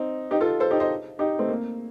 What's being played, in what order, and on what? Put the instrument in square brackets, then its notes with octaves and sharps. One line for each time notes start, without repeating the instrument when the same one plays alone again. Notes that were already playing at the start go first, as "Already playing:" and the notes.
Already playing: [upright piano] C4 D#4
D#4 G4
F4 A4
A4 C5
D#4 G4
C5 D#5
D#4 G4
A3 C4
A#3